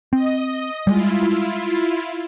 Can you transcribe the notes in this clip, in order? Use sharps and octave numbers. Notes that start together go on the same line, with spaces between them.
C4 D#5
G3 G#3 E4 F4